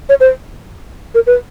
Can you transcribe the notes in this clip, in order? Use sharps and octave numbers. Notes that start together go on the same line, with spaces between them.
C#5
C5
A#4
B4